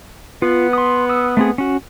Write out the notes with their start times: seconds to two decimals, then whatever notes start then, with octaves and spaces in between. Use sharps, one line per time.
0.42 B3 F4
0.73 C6 D#6
1.09 D#6 E6
1.37 A3 C4 G#4
1.58 C#4 F#4